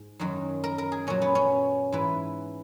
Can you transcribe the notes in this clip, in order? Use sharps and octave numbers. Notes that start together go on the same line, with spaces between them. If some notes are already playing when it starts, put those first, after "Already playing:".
Already playing: G#2
F#2 D#3 F#3
A#4
A#4
G#4
A#2 F#3 C#4
B3
C#4
G#2 E3 B4